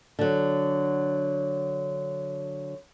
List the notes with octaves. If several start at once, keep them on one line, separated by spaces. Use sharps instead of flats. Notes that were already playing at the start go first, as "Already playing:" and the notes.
D3 F#3